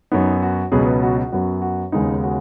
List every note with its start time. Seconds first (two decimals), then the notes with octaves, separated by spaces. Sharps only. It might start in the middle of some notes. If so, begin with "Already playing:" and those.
0.12 F#2 F#3 B3 D#4
0.42 F#4
0.72 C#2 B2 F#3 B3 G#4
0.86 B4
1.02 F#4
1.18 F#4
1.32 F#2 F#3 B3 F#4
1.62 F#4
1.92 D#2 C#3 G#3 B3 D#4
2.23 F#4